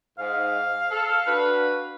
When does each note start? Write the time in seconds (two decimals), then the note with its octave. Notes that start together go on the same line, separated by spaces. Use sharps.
0.19 G#2 F5
0.90 A4
1.27 D4 F#4 B4